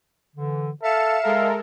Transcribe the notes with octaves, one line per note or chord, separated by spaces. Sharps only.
D3 E3
A4 E5 F5 C#7 E7
G#3 A4 A#4 F5